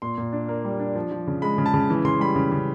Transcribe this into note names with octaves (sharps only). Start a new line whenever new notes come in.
A#2 C6
A#2
D4
A#3
G3
D4
F3
F3
C#3
G#3 B5
C#3
A5
C#3
E3
C#3 C6
G3 B5
C#3
C#3